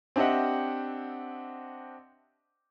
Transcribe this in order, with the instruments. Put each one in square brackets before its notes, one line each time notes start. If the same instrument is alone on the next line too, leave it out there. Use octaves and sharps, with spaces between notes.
[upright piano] C4 D4 G4 D#5 E5 F#5